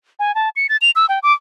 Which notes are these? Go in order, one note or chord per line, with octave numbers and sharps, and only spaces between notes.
G#5
A5
C#7
A6
F7
E6
G5
D6